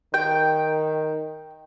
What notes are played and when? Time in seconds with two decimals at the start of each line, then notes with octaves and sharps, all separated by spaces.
0.14 D#3 G5